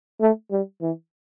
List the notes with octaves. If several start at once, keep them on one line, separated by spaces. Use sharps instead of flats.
A3
G3
E3